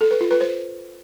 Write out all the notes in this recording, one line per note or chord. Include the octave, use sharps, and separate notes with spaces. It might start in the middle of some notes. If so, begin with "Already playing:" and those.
A4
B4
F4
B4
C5